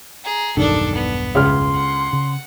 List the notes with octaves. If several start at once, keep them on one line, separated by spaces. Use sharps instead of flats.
G#4 A#5
E1 B1 G2 D#3 D4 A4
B3
C#2 C6 F6
F#5
C#3